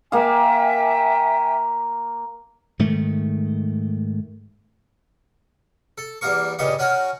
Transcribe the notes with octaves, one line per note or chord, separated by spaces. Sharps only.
A#3 E5 F5 G5 G#5
G#2 D#3 A3
A4
E2 G3 A#3 A#4 C#6
G2 A#2 C#3 G4 D#5 C#6
C#4 F#4 A#4 C#5